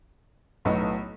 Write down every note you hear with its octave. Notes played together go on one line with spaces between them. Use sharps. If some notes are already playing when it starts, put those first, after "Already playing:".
B1 A2 F#3 B3 D#4